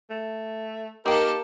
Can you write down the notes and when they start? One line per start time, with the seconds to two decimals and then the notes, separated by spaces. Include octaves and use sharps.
0.10 A3
1.06 A#3 D#4 G4 A4 A#4 G5